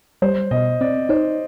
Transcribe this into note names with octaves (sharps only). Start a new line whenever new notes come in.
G3 C5
B2 D#5
C4 D5
D#4 C5